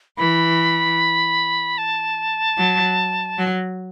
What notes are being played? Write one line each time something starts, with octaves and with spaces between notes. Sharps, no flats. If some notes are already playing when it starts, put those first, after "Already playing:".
E3 B5
A5
F#3
F#3